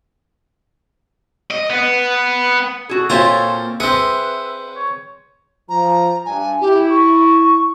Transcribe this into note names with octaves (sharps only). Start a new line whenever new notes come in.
D#5
B3
F#4 G#4 A4
A#2 C4 F4 C#5 E5 A#5
C4 G#4 B4 E5 C#7
C#5
F3 A#5
G2 G#5
E4 G4
C#6